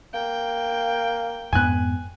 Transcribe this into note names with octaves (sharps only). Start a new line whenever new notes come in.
A#3 G5
F2 G#2 B3 G#5 F#6